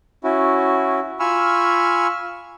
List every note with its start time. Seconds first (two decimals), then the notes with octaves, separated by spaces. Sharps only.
0.24 C#4 E4 F#4
1.20 F4 G#5 B5 C#6 E6 F6